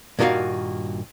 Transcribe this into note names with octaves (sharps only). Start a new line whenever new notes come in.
G2 A#2 D#3 A#3 F#4 F5